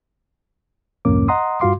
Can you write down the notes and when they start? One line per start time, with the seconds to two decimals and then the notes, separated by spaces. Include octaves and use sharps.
1.05 C2 F2 G#2 A#3 C#4 D6
1.28 D#5 F#5 A#5 C6 D#6
1.60 G2 F4 F#4 F5 C6 D6